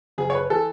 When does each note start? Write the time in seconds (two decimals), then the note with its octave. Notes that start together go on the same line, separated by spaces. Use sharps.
0.18 F#1 G#4
0.30 C#5
0.35 B4
0.50 E3 A4